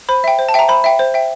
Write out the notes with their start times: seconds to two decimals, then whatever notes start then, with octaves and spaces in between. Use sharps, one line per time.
0.09 C5 B5
0.24 E5 G5
0.39 C5
0.49 A5
0.54 E5 G5 A#5
0.68 C5 B5
0.84 E5 G5
0.99 C5
1.14 E5 G5